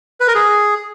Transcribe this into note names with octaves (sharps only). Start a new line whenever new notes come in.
B4
A#4
G#4